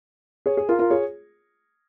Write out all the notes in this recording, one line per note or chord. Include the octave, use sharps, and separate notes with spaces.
G#4 C#5
G#4
F4 A#4
F4 A#4
G#4 C#5